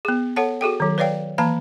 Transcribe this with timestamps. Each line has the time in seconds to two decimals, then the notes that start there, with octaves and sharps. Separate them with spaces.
0.05 B3 G#4
0.36 A4 C#5 F#5 A5
0.61 F#4 G#4 A4 G5
0.80 D#3 F#3
0.98 B4 C#5 D5 F5 G5
1.38 E3 A#3 A5 A#5